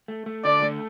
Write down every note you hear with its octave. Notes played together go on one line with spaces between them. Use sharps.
A3
A3
D3 D5
A3